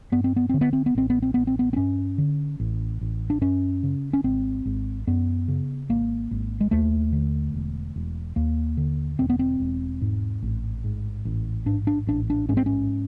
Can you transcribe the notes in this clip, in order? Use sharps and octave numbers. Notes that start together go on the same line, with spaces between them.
G2 B3
C4
B3
D3 C4
B3
C4
B3
A1 C4
B3
C4
A1 B3
C4
B3
C4
G2 C#4
D3
A1
A1
D4
F#2 C#4
C#3
C#4
G#1 C4
G#1
F#2 B3
C#3
G#1 A#3
G#1
G#3
D#2 A3
D3
E1
E1
D#2 A#3
D3
E1 C4
B3
C4
E1
G#2
A1
G#2
A1
G#2 D4
D4
A1 D4
D4
G#2 C#4
C4
C#4